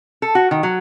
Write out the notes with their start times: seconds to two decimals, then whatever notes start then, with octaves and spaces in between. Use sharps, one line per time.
0.22 A4
0.35 F#4
0.51 D#3
0.63 F#3